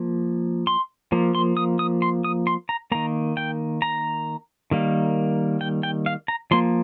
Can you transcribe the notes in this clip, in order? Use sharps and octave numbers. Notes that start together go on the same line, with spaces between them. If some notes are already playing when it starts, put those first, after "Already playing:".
Already playing: F3 A#3
C6
F3 A#3
C6
D#6
D#6
C6
D#6
C6
A#5
D#3 A#3 A#5
G5
A#5
D#3 G3 A#3
G5
G5
F5
A#5
F3 A#3 C6